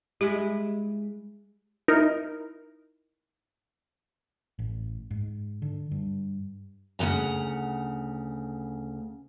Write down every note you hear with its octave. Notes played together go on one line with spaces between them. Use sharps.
G#3 E4 G4
D#4 E4 A#4
A1
G#2
D3
G2
D2 C#3 F3 F#5 A#5